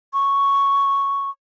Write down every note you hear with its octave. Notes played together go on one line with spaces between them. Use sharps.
C#6